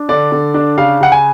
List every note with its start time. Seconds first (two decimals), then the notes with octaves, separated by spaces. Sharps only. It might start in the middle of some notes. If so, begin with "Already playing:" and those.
Already playing: D4
0.09 D3 D5
0.32 D3
0.54 D4
0.78 C#3 F5
1.01 C#3 F#5
1.12 G#5